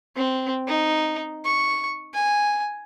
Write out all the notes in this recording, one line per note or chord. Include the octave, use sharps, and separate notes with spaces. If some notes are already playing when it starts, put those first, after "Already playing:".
C4
D#4
C#6
G#5